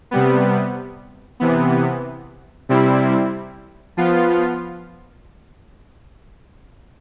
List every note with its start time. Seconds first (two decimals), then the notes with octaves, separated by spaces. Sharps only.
0.11 C3 G3 B3
1.40 C3 E3 B3
2.69 C3 G3 C4 E4
3.97 F3 B3 F4